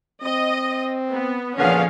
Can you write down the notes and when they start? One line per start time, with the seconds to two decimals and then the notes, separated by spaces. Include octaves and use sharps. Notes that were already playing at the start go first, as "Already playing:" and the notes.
0.23 C4 D#5
1.12 B3
1.58 A#2 D3 F3 B3 C#4 G#4 F5